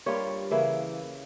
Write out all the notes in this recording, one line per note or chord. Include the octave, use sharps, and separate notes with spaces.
G2 G3 A#3 F4 C#5
C#3 E3 A#3 E4